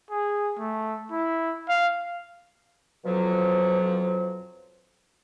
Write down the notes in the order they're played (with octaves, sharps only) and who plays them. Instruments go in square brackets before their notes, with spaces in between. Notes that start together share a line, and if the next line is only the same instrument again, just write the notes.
[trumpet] G#4
A3
E4
F5
[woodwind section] F2 B2 F3 F#3